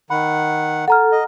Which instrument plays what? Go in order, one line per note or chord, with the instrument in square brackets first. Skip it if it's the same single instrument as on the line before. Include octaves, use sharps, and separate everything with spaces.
[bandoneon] D#3 F#5 [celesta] B5
[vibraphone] A4 [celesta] F#5 A#5 F6
[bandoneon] D#5